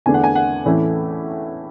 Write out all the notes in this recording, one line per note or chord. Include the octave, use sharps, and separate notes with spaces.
E2 D3 A3 D4 G#5
F#5
G#5
F#5
A2 E3 A3 C#4 E4